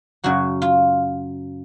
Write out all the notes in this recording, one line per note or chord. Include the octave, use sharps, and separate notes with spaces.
F#2 C#3 F#3 F#4
F4